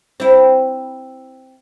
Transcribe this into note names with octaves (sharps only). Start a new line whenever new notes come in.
C4 E4